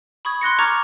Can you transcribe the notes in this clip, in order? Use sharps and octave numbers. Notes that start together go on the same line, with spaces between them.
B5 C#6 D#6 G#6
C6 F#6 A#6 C#7
A#5 C#6 D6 F6 G#6 A6